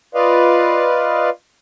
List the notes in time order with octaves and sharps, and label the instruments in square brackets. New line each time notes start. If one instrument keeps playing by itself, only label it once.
[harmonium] F4 B4 D5 D#5 F5